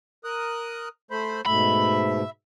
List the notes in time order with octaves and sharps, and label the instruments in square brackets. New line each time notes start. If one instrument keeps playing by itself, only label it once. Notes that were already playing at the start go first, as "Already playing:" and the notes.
[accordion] A#4 D#6 F#6
A3 C5 B5
[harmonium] G#2 B2 A3 [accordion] E5 [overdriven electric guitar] B5